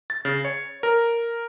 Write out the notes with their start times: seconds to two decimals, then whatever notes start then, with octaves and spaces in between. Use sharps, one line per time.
0.10 A6
0.25 C#3
0.45 C#5
0.83 A#4